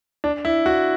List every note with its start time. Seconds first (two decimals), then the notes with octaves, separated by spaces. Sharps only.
0.24 D4
0.45 E4
0.66 F#4